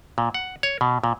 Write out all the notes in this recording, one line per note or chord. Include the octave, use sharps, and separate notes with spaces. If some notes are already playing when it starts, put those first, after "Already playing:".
A#2
F#5
C#5
B2
A#2